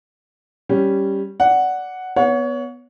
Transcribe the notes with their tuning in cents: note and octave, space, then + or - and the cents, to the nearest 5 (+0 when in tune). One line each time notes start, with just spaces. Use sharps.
G3 +0 C#4 -5
D5 -10 F#5 +0
B3 +0 C#5 +25 F#5 -30